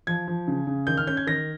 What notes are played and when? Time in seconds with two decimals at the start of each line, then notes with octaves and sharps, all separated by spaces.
0.07 F3 G#6
0.28 F3
0.48 C#3
0.67 C#3
0.87 D#3 G6
0.97 F6
1.07 C#4 G6
1.17 G#6
1.27 D#3 A#6